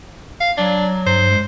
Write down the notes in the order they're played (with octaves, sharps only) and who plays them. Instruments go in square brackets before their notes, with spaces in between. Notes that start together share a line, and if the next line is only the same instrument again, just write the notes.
[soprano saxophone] F5
[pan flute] F#3 [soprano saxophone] D4
[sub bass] G2 [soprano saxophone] C5
[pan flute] G#3